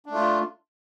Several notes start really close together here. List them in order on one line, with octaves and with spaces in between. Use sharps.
D4 A3 F4